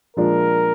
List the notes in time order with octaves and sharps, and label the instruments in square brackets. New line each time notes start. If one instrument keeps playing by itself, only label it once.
[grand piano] A#2 F3 G#3 D4 F4 [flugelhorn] A#4